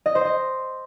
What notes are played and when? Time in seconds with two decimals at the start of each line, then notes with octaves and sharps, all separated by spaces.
0.06 D#5
0.15 C5
0.25 D#5